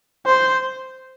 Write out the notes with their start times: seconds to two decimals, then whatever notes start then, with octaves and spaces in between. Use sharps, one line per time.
0.26 C5